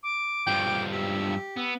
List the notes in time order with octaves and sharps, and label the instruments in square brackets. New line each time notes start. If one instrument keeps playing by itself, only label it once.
[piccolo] D6
[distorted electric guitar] G2 F3 [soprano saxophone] G5
[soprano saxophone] G4 [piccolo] E6
[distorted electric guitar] B3 [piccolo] E6